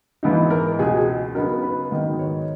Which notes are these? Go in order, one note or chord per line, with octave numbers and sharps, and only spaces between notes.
G#2 E3 B3 D#4
A#4
C#2 B2 G#3 G#4
C#3 F#3 B3 D#4 A#4
B4
G#2 D#3 F#3 B3
C#5